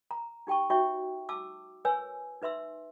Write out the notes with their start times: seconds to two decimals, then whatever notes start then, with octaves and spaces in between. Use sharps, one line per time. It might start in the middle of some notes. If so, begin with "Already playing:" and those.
0.11 A#5
0.47 D#4 G4 G5 A5 C#6
0.70 D#4 F#4 C#5 E5 G5 C#6
1.29 A5 D6 E6
1.85 A#4 B4 C#5 G#5 E6
2.42 D#4 B4 E5 C6 E6